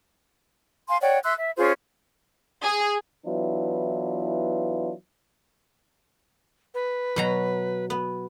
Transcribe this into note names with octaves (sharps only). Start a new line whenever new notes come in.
F5 G#5 C6
C#5 D5 F#5 G5
E5 C6 E6 F#6
E5
C#4 F4 G#4 C5
G#4
E3 F#3 B3 D4 E4 F4
B4
B2 F#3 A#5
B3